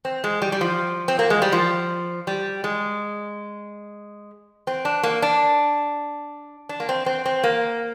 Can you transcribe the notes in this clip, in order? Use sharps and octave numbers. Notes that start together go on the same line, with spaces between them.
C4
G#3
G3
G3
F3
C4
A#3
G#3
G3
F3
G3
G#3
C4
D4
A#3
D4
D4
A#3
C4
C4
C4
A#3